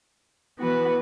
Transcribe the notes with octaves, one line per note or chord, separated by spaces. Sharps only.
E3 B3 F#4 B4